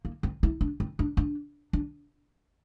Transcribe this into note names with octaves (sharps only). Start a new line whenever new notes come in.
A#3
C4
E4
D4
C4
D4
D4
D4